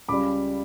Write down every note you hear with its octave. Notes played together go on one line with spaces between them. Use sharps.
C#2 C#3 G3 B5 D6